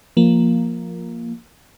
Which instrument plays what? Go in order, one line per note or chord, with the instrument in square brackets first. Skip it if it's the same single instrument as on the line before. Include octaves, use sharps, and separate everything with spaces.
[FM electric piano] F3 A#3